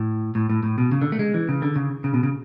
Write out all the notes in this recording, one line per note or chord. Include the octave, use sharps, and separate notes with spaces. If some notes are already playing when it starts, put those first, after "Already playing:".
Already playing: A2
A2
A2
A2
B2
C#3
D3
A3
G#3
E3
C#3
D3
C#3
C#3
B2
C#3